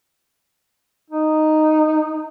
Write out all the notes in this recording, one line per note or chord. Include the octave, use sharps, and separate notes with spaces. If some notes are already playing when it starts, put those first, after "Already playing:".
D#4